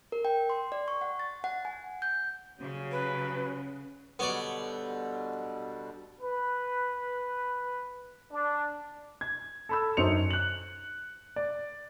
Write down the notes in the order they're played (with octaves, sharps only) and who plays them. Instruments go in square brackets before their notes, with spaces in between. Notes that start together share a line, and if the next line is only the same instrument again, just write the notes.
[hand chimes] A#4
G5
C6
D5
C#6
F#5
A6
F#5
G#5
G6
[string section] C#3 [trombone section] F#3 G3 C#4
[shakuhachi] B4
[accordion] B2 D3 G3 [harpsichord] B3 C#5 D5
[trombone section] B4
D4
[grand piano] G#6
A4 B5 E6
F#2 D#4 C5 C6 C#7 F7
F#6 F#7
D5